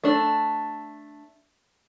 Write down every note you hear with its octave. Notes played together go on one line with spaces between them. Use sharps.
A3 D4